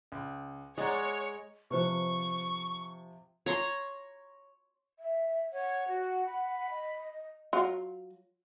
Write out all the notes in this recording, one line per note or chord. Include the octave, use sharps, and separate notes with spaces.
C#2
G#3 C#5 D5 F#5 A#5
C3 F3 G4 B4 C5 C#6
C#5 A#5 C6
E5
C#5 F#5
F#4
B5
D#5
F#3 F4